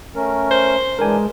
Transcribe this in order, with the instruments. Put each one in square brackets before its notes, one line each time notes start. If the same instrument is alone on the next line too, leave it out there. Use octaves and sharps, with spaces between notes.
[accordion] A3 C#4 A#4
[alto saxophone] C5
[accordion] E3 D4 [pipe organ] G#3 [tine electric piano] A#4 G#5